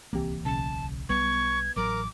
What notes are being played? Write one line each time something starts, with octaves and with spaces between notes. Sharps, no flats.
D1 C2 C3 E3 A#3 G4
B1 C#3 A5
B1 G3 B3 C#6 G#6
A1 F#3 A#4 D6